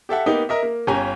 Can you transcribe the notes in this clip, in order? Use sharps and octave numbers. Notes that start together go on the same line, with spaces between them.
G4 A4 E5 F#5
A#3 B3 D#4 G4
A#4 D#5 E5
A#3
G1 C#4 G4 G#5 A#5